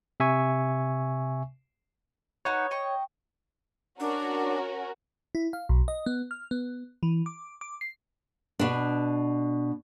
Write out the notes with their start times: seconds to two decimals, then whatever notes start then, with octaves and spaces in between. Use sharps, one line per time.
0.20 C3 E5 G#5 C#6
2.45 D#4 F#4 B4 C#5
2.71 D#5 G5 C#6
4.00 C#4 D4 F#4 A#4
5.35 E4
5.53 F5
5.69 B1
5.88 D#5
6.06 B3
6.31 F6
6.51 B3
7.03 E3
7.26 D6
7.61 D6
7.81 C7
8.59 B2 D4